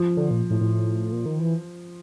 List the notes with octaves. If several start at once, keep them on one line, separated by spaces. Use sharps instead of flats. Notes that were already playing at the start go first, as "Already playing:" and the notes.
Already playing: F3
D3
A#2
A2
A2
A#2
D#3
E3